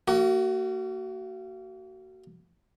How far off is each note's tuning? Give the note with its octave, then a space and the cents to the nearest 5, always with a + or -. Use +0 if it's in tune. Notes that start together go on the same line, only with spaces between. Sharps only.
A#3 -35 F#4 +25